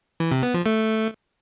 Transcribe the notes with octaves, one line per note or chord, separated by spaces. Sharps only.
E3
C3
B3
F3
A3